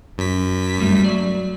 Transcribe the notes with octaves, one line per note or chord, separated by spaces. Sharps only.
F#2 B6
G2 G3 A3
F#3 D5